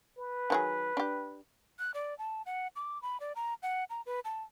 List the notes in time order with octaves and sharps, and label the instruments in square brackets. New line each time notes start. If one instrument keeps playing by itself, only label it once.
[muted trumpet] B4
[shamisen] D#3 F#3 G#4
D4 G4
[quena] F#6
D5
A5
F#5
D6
B5
D5
A#5
F#5
A#5
B4
A5